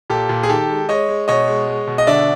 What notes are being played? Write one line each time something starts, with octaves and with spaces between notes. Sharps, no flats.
A#2 G4 A4
A#2
G#4
D#3 G4 A4
G#3
G#3 C#5 D#5
G#3
B2 C#5 D#5
G#3
G#3
B2
D#5
D3 D5 E5